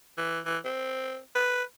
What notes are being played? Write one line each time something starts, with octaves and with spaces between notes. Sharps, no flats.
E3
E3
C4
B4